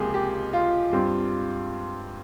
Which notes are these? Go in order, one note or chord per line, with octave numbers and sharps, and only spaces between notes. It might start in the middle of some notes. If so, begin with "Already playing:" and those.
Already playing: C#2 C3 F3 A#3 G4 G#4
G4
F4
G2 G3 C4